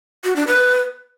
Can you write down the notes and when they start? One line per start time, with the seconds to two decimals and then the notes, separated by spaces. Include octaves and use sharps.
0.24 F#4
0.36 D4
0.47 B4